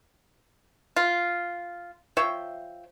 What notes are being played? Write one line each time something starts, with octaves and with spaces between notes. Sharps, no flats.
F4
F3 C#5 E5 G5